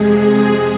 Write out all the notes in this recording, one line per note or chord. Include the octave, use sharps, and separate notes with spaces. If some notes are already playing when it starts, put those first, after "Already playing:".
Already playing: F2 C3 G#3 G#4
G#4